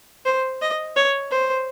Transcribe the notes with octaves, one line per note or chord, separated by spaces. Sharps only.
C5
D#5
C#5
C5